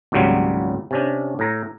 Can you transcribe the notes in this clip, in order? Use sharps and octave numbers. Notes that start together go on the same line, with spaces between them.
G#1 C#2 A#2 C#3 F#3 G3
C3 C#4 D4
A2 A#5